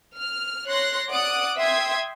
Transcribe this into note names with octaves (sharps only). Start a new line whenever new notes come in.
F6
C#5 C6 F#6 A#6
D5 F#5 D6 D#6 F#6 D7
E5 G5 C6 D#6 G#6